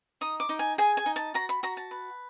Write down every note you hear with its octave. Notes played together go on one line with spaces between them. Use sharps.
D#4 D#6
D6
D#4
G#5
G#4 G#5
G#5
D#4
A5
F#4 A#5
B5
F#4 A#5
A5
B4